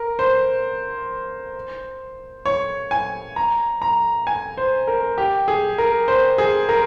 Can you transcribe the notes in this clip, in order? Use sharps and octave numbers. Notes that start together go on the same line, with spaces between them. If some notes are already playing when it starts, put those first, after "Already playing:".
Already playing: A#4
C5
C#5
G#5
A#5
A#5
G#5
C5
A#4
G4
G#4
A#4
C5
G#4
A#4